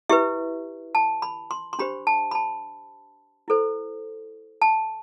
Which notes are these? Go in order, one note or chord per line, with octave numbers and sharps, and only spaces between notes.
E4 G4 B4 E5
A5
B5
C6
C6
D4 G4 C5 B5
A5
B5
A5
E4 A4 C5
A5